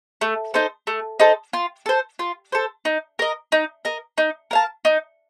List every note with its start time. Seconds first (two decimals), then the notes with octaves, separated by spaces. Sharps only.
0.21 A3
0.54 D#4 A4 C5
0.87 A3
1.20 D#4 A4 C5
1.53 F4
1.86 A4 C5
2.19 F4
2.52 A4 C5
2.85 D#4
3.19 A#4 D#5
3.52 D#4
3.85 A#4 D#5
4.18 D#4
4.51 A#4 F5 A5
4.85 D#4